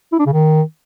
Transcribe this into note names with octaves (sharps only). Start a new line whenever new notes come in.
E4
D4
C#3
D#3